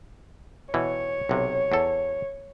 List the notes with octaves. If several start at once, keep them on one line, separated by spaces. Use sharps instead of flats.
B2 E3 C#5
B1 C3
E2 A4